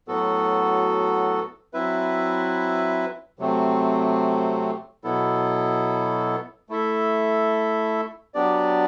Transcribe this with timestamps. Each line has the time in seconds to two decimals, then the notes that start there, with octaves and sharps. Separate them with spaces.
0.08 A2 F#3 B3 F#4 A4
1.73 F#3 C4 E4 B4 E5
3.39 C3 F#3 A3 C4
5.04 B2 F#3 B3 E4 A4
6.69 A3 E4 A4 E5
8.34 F#3 B3 D4 G4 D5